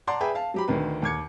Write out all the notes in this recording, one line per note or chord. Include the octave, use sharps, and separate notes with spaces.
D5 F#5 A5 A#5 C6 D6
G#4 B4 E5 G5 G#5 B5
F5 A5
F#3 G4 B5
D2 D3 D#3 B4
D#2 D6 G#6 C#7